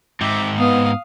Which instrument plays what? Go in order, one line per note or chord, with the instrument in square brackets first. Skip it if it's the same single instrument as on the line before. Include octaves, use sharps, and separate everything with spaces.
[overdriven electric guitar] G#2 C4 [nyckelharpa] E5 D6
[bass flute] B3 [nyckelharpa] F5 D#6